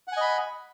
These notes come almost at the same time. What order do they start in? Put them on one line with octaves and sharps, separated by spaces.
F#5 G#5 D#5 B5